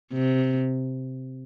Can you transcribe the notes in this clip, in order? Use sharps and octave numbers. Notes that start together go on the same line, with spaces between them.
C3